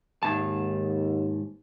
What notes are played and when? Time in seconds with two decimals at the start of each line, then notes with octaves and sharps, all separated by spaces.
0.23 D#2 G#2 A5